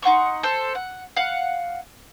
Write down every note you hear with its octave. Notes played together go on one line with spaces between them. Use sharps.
D#4 F#5 C6 C#6
A4 C5
F#5
F5 F#5